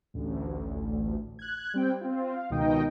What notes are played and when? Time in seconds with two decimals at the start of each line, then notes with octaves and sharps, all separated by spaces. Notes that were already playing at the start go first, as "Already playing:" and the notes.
0.14 A1 D2
1.39 F#6 G#6
1.74 G3 C4 G5
2.01 C4 F4
2.36 F5
2.50 C#2 B2 D#3 D#4 D#5 G5